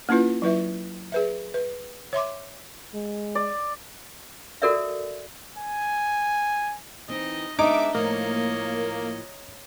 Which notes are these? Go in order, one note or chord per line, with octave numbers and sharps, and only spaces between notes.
A#3 C#4 E4 F4 B4
F#3 E4 B4 E5
G#4 B4 E5
B4
C#5 E5 C6 D6
G#3
D5
F#4 A4 A#4 D5 E5
G#5
E3 C4 D#4 D#5
G#3 B3 D4 D#4 E5 D6
A2 F3 A#3 C#5 D#5